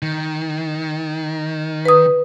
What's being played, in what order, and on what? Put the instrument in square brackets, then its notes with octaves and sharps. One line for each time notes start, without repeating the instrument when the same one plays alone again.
[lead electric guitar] D#3
[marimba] B4 D#6